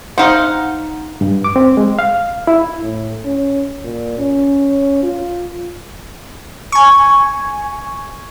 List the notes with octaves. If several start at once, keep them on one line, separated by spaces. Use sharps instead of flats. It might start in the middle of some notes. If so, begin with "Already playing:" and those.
D#4 C5 F5 F#5
G2
D6
C4
G#3
F5
E4
A2
C#4
A#2
C#4
F4
G#5 C#6